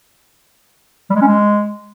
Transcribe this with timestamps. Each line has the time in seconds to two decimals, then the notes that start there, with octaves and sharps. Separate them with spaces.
1.10 G3
1.16 G#3
1.22 C#4
1.27 G#3